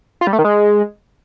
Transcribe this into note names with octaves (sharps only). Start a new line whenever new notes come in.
F4
G3
A3
D#3
G#3